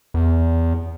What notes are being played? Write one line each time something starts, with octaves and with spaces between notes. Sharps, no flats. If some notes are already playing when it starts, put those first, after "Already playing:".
E2